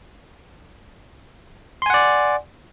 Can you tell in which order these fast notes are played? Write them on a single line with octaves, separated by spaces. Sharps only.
C6 G#5 F#5 D5